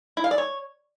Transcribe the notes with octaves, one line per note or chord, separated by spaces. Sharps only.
E4
F5
D5
C#5